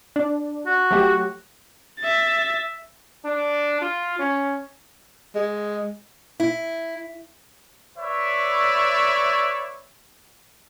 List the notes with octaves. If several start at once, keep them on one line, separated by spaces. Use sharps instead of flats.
D4
F#4
F#3 A3 G4
E5 A6
D4
F4
C#4
G#3
E4
B4 C#5 D5 E5